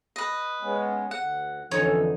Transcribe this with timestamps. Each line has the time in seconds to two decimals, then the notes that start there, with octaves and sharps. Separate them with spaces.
0.16 B4 D#5
0.62 G#3 B3 C#4
1.11 D2 F#5
1.71 F2 D3 E3 C#4 D#4 A4 C#5